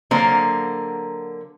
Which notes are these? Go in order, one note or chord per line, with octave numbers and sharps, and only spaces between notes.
D3 F#3 A#3 A#4 C5